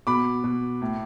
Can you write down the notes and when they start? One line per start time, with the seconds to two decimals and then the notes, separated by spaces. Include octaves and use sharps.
0.07 B2 B5 D6
0.44 B2
0.82 A2